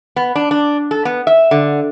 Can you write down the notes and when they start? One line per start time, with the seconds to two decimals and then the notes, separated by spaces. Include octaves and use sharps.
0.16 B3
0.35 D4
0.51 D4
0.91 A4
1.05 B3
1.27 E5
1.51 D3